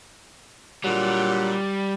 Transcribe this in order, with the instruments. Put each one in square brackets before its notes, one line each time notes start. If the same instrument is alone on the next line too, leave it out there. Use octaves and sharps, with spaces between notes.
[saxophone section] A#2 D3 F#3 [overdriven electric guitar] G3